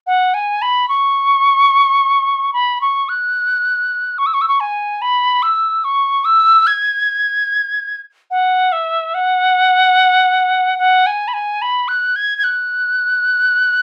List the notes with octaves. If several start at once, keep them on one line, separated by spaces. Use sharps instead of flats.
F#5
G#5
B5
C#6
B5
C#6
F#6
C#6
E6
C#6
E6
C#6
G#5
B5
E6
C#6
E6
G#6
F#5
E5
F#5
F#5
G#5
B5
G#5
B5
F#6
G#6
G#6
F#6